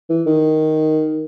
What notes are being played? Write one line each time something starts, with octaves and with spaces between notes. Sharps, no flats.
E3
D#3